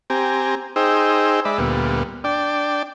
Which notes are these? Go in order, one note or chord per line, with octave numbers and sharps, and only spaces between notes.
C4 G4 G#5 A#5
D#4 G#4 C5 G5 E6
G#3 D5 E5 B5
D2 A#2 G3 B3
D4 D5 G5